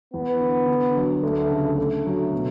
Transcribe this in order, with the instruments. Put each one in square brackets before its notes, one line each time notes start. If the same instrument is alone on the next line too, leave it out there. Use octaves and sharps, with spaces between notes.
[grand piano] E2 [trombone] B3
[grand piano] D3
D3
F#3
[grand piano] D2 [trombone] A3
[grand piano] C#3
[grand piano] D3 [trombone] A3
[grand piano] F#3
B2